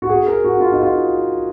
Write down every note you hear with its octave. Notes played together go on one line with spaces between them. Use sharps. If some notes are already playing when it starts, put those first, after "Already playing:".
F#4
G#4
A#4
F#4
F4
D#4
F4